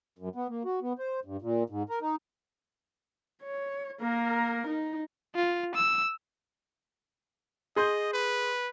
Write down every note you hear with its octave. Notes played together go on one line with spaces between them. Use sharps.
F#2
B3
A#3
F#4
B3
C5
G2
A#2
G#2
A#4
D#4
C#5
A#3 A#4
D#4
F4
E6
G#4 D#5 C6 G6
B4